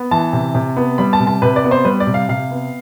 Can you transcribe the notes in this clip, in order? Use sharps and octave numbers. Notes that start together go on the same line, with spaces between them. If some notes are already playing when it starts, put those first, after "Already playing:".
Already playing: B3
E3 A5
C3
C3
B3
G3 B5
A5
C3
A5
C3 B4
D5
B3
C5
G3 B4
D5
C3
F5
C3 F5
B3